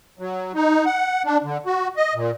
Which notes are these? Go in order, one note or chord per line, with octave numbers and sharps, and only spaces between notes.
F#3
D#4
F#5
D4
D3
F#4
D#5
A#2